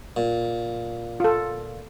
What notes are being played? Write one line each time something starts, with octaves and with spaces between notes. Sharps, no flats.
A#2
F4 A4